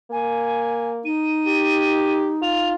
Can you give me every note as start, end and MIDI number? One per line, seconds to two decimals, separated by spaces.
0.11 1.07 58
0.11 0.89 80
1.05 2.74 63
1.05 2.14 99
1.47 2.33 67
2.42 2.75 65
2.42 2.68 101